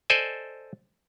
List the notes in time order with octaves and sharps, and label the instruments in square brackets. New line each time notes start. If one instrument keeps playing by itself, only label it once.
[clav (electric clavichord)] A4 C5 D5 D#5 G#5